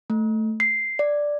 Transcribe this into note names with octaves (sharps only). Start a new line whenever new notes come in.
A3
C7
D5